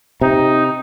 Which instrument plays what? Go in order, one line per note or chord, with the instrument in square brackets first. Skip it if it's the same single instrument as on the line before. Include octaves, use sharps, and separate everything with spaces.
[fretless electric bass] C3 [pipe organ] D#4